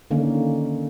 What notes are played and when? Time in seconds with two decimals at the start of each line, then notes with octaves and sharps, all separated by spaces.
0.11 D3 D#3 A#3 C#4